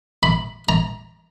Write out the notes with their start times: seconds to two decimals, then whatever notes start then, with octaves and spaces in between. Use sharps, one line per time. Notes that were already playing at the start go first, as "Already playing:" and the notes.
0.23 B5
0.69 A#5